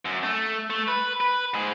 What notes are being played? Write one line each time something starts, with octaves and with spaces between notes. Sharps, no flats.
F#2
A3
A3
B4
B4
G#2 G#4